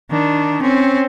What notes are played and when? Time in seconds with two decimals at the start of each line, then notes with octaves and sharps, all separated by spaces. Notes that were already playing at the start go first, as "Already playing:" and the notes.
0.10 D#3 D4
0.62 C4 C#4